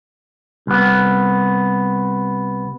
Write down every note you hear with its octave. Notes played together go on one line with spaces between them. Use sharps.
C2 B3